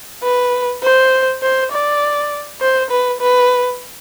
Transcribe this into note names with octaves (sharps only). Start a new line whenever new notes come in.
B4
C5
C5
D5
C5
B4
B4